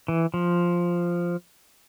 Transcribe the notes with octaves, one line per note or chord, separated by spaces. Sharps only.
E3
F3